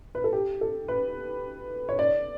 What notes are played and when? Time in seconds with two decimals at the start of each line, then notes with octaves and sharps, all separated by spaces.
0.15 B4
0.24 A4
0.33 G4
0.61 A4
0.88 B4
1.89 C#5
1.99 D5